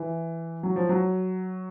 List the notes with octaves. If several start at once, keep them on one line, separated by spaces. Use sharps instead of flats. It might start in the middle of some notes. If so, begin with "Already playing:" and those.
Already playing: E3
F#3
F3
F#3